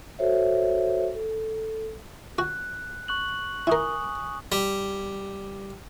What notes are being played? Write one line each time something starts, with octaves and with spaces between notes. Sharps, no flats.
F#4 A4 C5 C#5 E5
A4
F#4 F#6
C#6 F#6 F#7
E4 A#4 G#5 C#6 D#6
G3